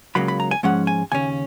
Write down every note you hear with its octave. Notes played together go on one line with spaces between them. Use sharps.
C#2 C#3 F#3 A#3 B5
B5
A#5
G#5
G#2 F3 G#3 C#4 F#5
G#5
D#2 C#3 C#4 G#5